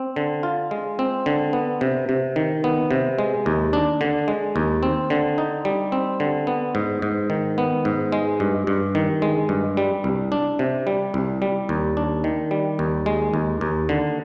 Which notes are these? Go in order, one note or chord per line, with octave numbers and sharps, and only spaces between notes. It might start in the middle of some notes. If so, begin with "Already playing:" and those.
Already playing: C4
D3
F4
G#3
C4
D3
B3
C3
C3
D#3
B3
C3
G#3
D#2
D4
D3
G#3
D#2
C4
D3
D#4
G3
C4
D3
B3
G#2
G#2
D#3
B3
G#2
G#3
G2
G2
D#3
G#3
G2
G3
C2
D4
C3
G3
C2
G3
D#2
D4
D#3
G3
D#2
G#3
D#2
D#2
D3